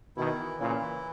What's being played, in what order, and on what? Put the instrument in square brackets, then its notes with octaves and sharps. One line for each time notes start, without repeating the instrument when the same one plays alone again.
[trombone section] B2 D#3 [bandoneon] E4
[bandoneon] E3
[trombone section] A#2 C#3 [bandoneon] E4
[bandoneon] E3